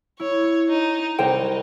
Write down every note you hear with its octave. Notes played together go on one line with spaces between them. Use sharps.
E4 C#5
D#4
C2 D#4 C5 G5